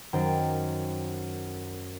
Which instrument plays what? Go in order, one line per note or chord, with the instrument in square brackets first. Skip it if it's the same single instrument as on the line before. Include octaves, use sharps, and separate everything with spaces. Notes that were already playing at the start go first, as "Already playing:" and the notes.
[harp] F#2 D#3 C5 G5 A#5 A6